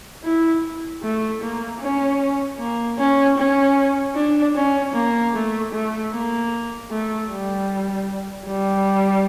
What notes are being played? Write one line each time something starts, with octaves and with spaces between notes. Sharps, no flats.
E4
A3
A#3
C#4
A#3
C#4
C#4
D4
C#4
A#3
A3
A3
A#3
A3
G3
G3